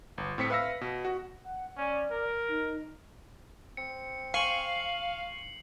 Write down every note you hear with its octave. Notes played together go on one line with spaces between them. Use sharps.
G1
A2 C4 B6 C#7
B4 E5 F5 E6 A#6
B2
F#4
F#5
C#4 D5
A#4
D#4
C4 C#7
F5 G#5 C6 C#6 C7 F#7